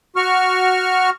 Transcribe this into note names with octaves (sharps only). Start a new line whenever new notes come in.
F#4 C#6 F6